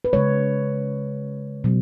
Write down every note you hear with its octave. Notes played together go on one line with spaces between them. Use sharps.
B4
C#3 G#3 C#5
B2 F#3